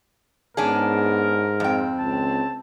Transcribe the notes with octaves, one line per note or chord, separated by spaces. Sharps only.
G#2 B3 C#4 D4 G#4 A#4
F2 C4 G5
C#2 A5